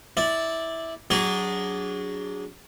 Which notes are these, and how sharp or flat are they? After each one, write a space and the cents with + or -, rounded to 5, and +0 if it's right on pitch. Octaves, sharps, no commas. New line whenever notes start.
E4 -15 D5 +0
F#3 +10 D4 -20 G#4 -15